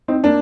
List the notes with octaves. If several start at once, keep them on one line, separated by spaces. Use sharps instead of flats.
C4 D#4
A#3 D4